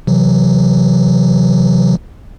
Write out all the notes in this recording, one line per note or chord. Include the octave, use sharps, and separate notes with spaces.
C3 E3 F#3